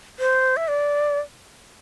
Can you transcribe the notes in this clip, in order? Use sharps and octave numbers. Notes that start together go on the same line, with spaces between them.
C5
E5
D5